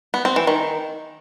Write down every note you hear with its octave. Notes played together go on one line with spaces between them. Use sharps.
B3
C4
E3
D#3